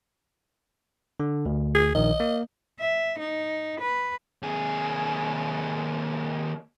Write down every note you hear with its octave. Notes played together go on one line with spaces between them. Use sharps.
D3
D2
G#4
A#1 D#3 D#5
A#3
E5
D#4
B4
D#2 G#4